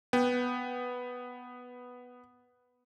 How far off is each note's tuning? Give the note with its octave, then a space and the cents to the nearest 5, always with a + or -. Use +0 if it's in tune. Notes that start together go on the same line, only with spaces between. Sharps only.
B3 +0 G5 -5